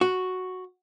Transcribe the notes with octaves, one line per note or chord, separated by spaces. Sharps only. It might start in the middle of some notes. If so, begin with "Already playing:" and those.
F#4